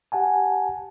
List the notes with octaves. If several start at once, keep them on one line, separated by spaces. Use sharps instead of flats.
G4 F#5 G#5 A5